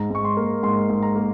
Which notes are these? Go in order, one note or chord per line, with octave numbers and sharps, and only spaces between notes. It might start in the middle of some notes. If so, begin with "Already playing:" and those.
Already playing: G#2 A#5
G#2 C#6
C6
A#3
G#2 C6
G#2
A#5
A#3